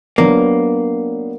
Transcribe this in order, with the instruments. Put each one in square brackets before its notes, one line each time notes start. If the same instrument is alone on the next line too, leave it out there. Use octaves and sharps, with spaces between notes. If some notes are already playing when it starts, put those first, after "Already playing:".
[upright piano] F#3 B3 D4 [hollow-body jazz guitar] A#3